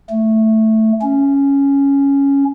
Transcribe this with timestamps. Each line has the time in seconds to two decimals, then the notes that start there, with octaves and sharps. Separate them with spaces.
0.10 A3
1.02 C#4